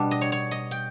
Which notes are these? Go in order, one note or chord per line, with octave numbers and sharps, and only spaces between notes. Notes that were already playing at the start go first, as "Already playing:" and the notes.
Already playing: B2 G3 B3 D4
D#5
C#5
C#5
D#5
G5